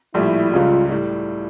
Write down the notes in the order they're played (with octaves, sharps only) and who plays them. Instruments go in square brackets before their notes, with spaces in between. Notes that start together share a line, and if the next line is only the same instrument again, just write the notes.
[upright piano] A#1 A2 G3 [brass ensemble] E4
[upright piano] C#2 C#3 G3 [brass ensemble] F4
[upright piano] A2 G3